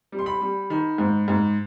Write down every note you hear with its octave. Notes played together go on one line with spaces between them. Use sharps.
G3
C6
B5
G3
D#3 B5
G#2
G#2